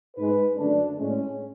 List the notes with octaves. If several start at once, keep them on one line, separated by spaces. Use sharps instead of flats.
G#2 G#3 B4
F#2 D3 A3 D4
A2 G#3 C#4